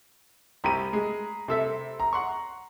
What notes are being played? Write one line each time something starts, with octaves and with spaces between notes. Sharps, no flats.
C2 G4 A#5 B5 D#7
G#3
C3 A4 E5
A#5
F#5 C6 C#6